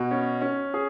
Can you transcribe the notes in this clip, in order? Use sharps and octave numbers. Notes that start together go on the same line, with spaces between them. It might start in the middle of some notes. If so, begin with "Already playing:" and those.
Already playing: B2
C#4
C#4
G#4